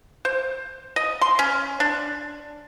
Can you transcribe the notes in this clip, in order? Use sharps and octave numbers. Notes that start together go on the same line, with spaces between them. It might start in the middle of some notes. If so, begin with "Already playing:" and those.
C5
D#5
C6
C#4
D4